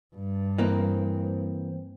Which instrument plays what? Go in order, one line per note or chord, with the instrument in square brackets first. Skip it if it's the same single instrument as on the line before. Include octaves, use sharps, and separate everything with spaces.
[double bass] G2
[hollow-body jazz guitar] E3 A#3 C4